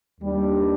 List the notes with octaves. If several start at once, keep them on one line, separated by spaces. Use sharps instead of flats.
D#2 D#3 G3 D4